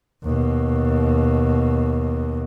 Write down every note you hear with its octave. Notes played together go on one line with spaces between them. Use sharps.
D#2 B2